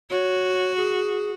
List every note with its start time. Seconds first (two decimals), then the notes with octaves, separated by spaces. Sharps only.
0.10 F#4 C#5
0.77 G#4